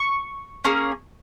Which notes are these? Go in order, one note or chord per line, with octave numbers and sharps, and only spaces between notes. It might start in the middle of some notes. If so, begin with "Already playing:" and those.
Already playing: C#6
A#3 C#4 G#4